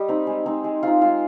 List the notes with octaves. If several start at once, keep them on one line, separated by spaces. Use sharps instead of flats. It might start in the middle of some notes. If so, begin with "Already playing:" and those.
Already playing: G3 D#5
C4 D#4
G#3
C4 D#4
G#3
C4 D#4 F4
G#3 F4